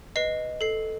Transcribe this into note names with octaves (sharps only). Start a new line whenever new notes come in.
B4 D#5 C7
A4 C7